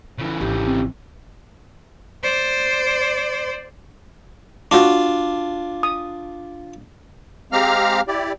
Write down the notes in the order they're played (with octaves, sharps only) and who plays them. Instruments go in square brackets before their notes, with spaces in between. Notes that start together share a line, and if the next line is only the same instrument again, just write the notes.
[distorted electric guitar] C#3 E3
[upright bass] G#1 [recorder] G4
[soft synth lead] C4
[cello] C5 D5
[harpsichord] D4 F4 [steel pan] F#4 D6
[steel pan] D#6
[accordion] G#3 C4 G4 F5 A#5 F6
E4 G4 D5